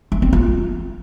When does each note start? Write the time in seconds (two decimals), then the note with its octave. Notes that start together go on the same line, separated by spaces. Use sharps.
0.12 A3
0.22 C4
0.33 F4